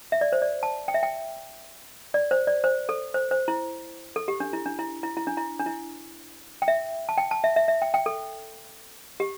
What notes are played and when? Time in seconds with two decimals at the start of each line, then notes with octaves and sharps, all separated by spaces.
0.12 E5
0.21 D5
0.33 C5
0.42 D5
0.63 A5
0.88 G5
0.94 E5
1.03 G5
2.14 D5
2.31 C5
2.47 D5
2.64 C5
2.89 A4
3.14 C5
3.31 C5
3.48 E4
4.16 A4
4.28 G4
4.40 D4
4.53 E4
4.66 D4
4.79 E4
5.03 E4
5.17 E4
5.27 D4
5.37 E4
5.59 D4
5.66 E4
6.62 G5
6.68 E5
7.09 A5
7.18 G5
7.31 A5
7.44 E5
7.56 E5
7.68 E5
7.82 G5
7.94 G5
8.06 A4
9.20 G4